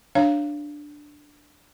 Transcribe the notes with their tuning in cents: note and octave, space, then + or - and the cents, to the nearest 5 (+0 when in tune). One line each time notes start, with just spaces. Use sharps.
D4 +5 C#5 +0 F5 -15